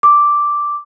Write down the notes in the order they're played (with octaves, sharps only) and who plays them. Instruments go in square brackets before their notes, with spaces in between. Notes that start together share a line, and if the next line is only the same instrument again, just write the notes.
[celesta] D6